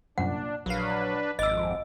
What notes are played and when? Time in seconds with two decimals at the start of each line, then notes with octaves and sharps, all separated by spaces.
0.18 C2 F#2 A#2 D4 F#5
0.66 A#1 F#3 D4 B4 F5
1.39 G#1 F2 D#5 D6 E6